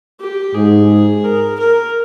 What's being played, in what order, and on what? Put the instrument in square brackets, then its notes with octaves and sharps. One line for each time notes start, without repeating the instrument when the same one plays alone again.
[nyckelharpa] G4
[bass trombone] G#2 [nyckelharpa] G#4
[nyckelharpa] A#4
A#4